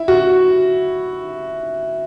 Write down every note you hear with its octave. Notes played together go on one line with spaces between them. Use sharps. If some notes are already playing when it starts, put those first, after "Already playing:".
Already playing: E4
F#4